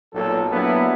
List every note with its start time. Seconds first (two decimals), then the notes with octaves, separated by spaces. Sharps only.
0.14 B1 A#2 F#3 A4
0.52 F#3 A#3 B3 D4 E4 G4